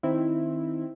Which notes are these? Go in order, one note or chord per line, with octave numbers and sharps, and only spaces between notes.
D#3 C4 E4